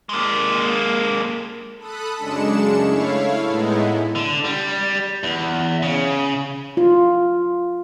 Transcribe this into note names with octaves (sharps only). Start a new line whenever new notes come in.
G#3 A#3
A4 B5 D#6 F#6
F#2 C#3 G#3 D4 C#7 E7
A3 E4 C#5 F5
A2 G#3 B3 D#4 E4
D3
G3
E2
C#3
F4